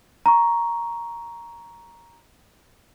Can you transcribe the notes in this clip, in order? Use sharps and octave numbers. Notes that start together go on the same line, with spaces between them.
A#5 C#6